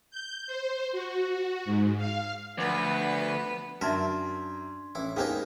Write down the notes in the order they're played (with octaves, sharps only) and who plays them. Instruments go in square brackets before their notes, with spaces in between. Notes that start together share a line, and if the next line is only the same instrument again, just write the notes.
[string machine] G6
C5
F#4
G#2
F5
[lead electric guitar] D2 [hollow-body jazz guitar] F3 C5 [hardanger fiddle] B3 B4 [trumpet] F#5
[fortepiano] F#2 [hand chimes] D4 C6 G#6 [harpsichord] A#4 [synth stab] E5 A5
[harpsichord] A1 E4
[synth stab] G#3 [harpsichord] A#3 B3 G#4 [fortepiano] D#4 G4 C5